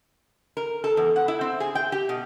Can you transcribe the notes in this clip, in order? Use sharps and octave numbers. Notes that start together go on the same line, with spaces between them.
A#4
A4
E2
F#5
E4
C4
G#4
G5
G4
B2